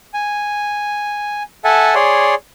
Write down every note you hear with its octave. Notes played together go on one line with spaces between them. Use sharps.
G#5
A4 E5 F#5 G#5 A5
G#4 C#5 D5 C6